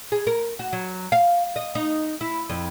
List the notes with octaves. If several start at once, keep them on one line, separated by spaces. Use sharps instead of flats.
G#4
A#4
F#4
F#3
F5
D#5
D#4
E4
F2